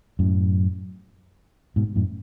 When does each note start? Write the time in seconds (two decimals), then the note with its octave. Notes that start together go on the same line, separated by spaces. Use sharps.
0.19 F#2 A2
1.76 G#2 B2
1.96 F#2 A2